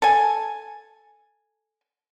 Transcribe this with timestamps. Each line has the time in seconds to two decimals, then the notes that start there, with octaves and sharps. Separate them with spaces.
0.02 A4 G#5